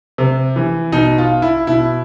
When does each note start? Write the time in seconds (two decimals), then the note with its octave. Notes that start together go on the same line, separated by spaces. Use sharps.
0.18 C3
0.56 E3
0.92 B2 D#4
1.18 F4
1.42 E4
1.67 B2 E4